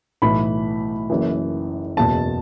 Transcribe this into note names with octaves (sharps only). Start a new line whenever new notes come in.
B1 A2 E3 B5
F#1 F#2 E3
F#1 E2 B2 A5